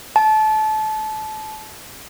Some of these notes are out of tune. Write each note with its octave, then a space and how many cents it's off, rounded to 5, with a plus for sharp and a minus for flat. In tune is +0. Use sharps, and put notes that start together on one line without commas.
A5 -25